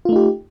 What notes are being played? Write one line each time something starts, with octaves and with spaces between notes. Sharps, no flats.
A3 D#4 F4 G4